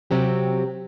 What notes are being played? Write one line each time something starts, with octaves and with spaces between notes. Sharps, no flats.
C3 F#3 C4 G4